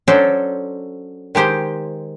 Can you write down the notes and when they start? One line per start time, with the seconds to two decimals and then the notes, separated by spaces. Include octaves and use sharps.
0.08 F#3 C#4 D4 A4 C5
1.35 D#3 G#3 G4 C5